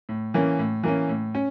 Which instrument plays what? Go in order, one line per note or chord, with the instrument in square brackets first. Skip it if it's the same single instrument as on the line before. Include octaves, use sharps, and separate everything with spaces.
[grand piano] A2
E3 A#3 C#4
A2
E3 A#3 C#4
A2
C#4